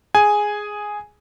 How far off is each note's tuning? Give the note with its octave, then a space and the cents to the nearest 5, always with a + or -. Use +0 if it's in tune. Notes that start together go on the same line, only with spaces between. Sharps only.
G#4 +0 G#5 +0